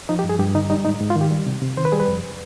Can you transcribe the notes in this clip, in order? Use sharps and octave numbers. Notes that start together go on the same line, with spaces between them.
F3 D#4
G4
G2
G#4
G2 G4
D3 D#4
G3 D#4
G#2 D#4
G#2
F4
D#3
G4
G3
C3
C3
D#3 C5
B4
G3 G#4
B4
F2